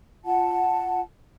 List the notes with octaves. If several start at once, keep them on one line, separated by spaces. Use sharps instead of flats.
F4 F#5 A5